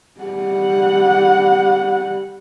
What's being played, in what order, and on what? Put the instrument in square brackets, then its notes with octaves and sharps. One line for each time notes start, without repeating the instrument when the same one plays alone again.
[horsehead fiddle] G3 F#5